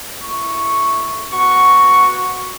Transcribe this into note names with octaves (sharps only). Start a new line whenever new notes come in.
A3 E4 C#6
B3 F#4 C#6